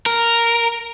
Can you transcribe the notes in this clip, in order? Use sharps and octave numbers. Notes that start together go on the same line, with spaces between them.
A#4